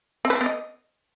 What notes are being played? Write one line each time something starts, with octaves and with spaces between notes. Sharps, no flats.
C4
B4
C4
B3
D#5